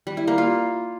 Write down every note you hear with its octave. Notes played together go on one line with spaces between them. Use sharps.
G3
E4
A#3
F4